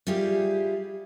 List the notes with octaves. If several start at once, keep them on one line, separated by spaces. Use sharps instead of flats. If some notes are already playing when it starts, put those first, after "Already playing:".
G3 E4 F4 G4 G#4